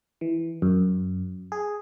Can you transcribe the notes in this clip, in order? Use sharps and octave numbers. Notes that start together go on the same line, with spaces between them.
E3
F#2
G#4